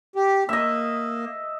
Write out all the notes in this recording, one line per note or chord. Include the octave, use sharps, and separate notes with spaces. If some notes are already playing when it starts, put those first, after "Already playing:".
G4
A#3 D#5 E5